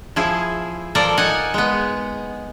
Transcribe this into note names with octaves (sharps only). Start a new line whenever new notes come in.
F3 E4 G#4
F3 A4 A#4 D5 A#5
D#4 F#5 G#5
G#3 B3